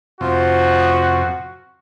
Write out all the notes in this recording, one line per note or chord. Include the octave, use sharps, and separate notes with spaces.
F2 C3 F3 F#4